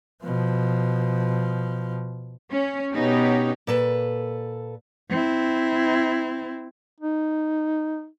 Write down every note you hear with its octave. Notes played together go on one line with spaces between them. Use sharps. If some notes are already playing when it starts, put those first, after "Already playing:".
B2 F3
C#4
B2 B3 C#4 D#4 G4
A#2 A4 B4
C4 E4
D#4